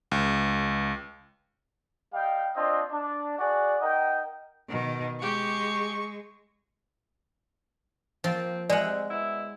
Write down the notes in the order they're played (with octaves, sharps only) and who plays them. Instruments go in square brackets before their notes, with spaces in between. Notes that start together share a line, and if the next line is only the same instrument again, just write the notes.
[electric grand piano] C#2
[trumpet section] G3 D#5 F5 G5
C4 D4 F4 D#5
D4
F#4 G#4 D5
D#4 A#4 D#5 F#5 G5
[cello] B2 D#3
[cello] G#3 [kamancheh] G4 [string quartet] C#6
[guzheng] F3 [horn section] A#3 C4
[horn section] C3 [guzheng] G#3 F#5 [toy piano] D5 G#5
[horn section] B2 E4